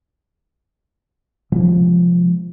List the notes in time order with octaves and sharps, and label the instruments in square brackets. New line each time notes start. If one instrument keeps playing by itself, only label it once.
[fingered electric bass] C3 F3 G#3